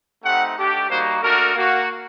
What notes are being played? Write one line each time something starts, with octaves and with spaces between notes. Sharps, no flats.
A3 C4 D#4 G4 F#5
A3 D4 G4
G3 A#3 D#4 F#4 C5
A3 D4 F#4 A#4
A#3 F#4